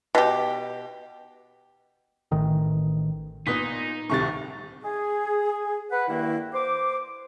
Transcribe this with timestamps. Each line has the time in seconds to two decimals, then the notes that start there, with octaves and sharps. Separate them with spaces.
0.15 B2 G4
2.32 A1 D#3
3.47 A#2 B3 D#4 D#6 B6
4.10 D1 C2 C3 D#3 C#6 A6
4.83 G#4
5.90 B4 F#5
6.08 G2 D#3 A#3 E4
6.53 C5 D6